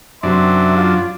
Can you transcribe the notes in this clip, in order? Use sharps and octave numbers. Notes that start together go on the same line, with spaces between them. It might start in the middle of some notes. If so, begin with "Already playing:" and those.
F#2 C3 D4 E5 C6
F4